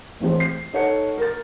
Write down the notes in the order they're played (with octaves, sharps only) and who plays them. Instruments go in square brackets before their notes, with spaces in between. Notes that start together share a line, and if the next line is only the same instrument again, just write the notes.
[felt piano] A1 E3 C4 G#4
C7
D#4 A4 C#5 F#5 C#7
A#4 A6